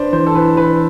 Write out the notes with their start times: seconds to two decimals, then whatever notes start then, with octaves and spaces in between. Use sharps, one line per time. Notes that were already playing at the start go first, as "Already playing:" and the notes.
Already playing: D4 B4 C5 D5
0.13 E3 C5
0.27 A4
0.35 E3 B4
0.56 E3 B4